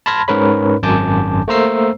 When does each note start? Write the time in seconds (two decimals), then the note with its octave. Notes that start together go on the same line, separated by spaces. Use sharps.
0.06 A5 B5 C6 F6 G#6 A#6
0.28 G#2 C#4 A#4 B4 C#5 B5
0.83 G#1 F#2 G#5 A5 D6 G6
1.48 A3 A#3 C5 A#5 E6 C7